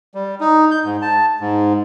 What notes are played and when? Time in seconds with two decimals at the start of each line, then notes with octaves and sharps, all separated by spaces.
0.15 G3
0.40 D#4
0.71 G6
0.84 G#2
1.02 A5
1.41 G#2